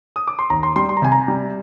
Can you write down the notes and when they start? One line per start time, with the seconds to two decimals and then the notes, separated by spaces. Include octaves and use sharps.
0.16 D#6
0.27 D6
0.39 C6
0.50 D#2 A#5
0.63 C6
0.76 G3 C6
0.89 C6
0.97 A#5
1.02 C3 G#5
1.12 A#5
1.28 G3